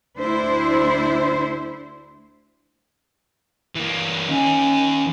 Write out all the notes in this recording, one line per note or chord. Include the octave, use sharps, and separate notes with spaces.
D2 D4 E4 C5
E3 A#3
D#2 C#4 D#4